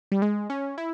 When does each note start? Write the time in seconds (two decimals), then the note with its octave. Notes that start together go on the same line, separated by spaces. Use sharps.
0.12 G3
0.22 G#3
0.50 C#4
0.78 E4